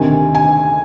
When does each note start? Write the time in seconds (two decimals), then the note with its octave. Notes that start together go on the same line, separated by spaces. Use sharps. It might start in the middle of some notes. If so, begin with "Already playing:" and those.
Already playing: D2 C3 D#3 G#5
0.35 G#5